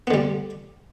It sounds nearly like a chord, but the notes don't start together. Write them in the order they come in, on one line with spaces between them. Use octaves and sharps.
B3 D3 G3